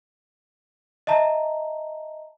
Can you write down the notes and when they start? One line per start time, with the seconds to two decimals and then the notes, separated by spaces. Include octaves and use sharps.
1.07 D#5 E5 A5 A#5